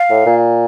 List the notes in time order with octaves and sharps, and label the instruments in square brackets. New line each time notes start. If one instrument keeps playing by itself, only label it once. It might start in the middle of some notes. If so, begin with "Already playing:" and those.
Already playing: [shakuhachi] F5
[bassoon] A2
A#2